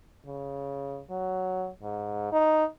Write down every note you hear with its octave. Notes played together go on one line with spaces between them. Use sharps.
C#3
F#3
G#2
D#4